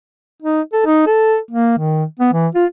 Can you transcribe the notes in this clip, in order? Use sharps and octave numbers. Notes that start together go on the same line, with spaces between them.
D#4
A4
D#4
A4
A#3
D#3
B3
E3
F4